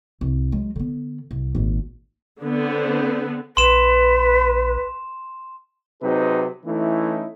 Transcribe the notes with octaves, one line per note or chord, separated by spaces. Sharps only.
C2
F#3 G#3
D3 B3
C2
G#1 A#2
D3 B3 C4
A#1 B4 C6 E7
C3 F#3 C4 D#4 G#4 B4
E3 A3 C#4 D#4 E4